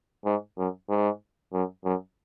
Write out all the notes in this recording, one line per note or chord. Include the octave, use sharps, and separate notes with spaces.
G#2
F#2
G#2
F#2
F#2